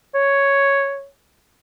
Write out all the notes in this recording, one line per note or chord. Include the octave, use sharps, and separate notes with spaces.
C#5